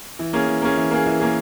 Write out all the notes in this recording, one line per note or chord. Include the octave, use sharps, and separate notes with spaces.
E3
A#3 C#4 G#4
E3
A#3 C#4 G#4
E3
A#3 C#4 G#4
E3
A#3 C#4 G#4